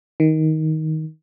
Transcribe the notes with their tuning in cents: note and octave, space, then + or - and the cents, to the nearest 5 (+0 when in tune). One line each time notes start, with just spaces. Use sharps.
D#3 +15